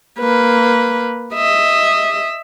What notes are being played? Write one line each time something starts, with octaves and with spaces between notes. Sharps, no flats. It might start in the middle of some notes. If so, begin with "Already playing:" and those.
A#3 B4
D#5 E5